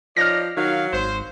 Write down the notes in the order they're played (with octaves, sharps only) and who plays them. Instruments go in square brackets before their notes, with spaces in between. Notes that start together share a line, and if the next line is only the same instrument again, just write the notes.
[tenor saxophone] F3 [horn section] D#4 C#5 D5 [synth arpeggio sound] F6 A#6
[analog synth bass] D#3 [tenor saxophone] F#3 [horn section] F5
[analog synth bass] G#1 [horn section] C5